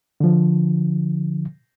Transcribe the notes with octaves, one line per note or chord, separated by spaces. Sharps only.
D3 F3